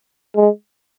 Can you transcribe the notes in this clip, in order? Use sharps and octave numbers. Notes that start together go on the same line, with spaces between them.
G#3